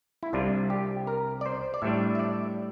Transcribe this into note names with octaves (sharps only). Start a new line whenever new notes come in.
E4
C2 C3 G3 D4 F4
G4
A#4
D5
C5
D5
A2 G3 D4 E5
E5
D5